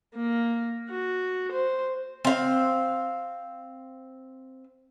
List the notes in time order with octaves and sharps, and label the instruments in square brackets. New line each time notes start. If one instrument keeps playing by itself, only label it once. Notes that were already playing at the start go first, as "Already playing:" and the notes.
[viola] A#3
F#4
C5
[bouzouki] C4 F5